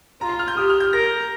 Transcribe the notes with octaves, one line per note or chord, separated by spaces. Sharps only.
F4 A#5
C6
F6
G6
G4 D#6
F6
G6
A#4 A#6